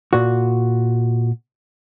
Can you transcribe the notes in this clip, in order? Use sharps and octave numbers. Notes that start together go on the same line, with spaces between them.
A#2 F#4